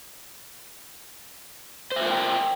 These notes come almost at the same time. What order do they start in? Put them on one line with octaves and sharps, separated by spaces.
C5 E5 F4 A#4 G5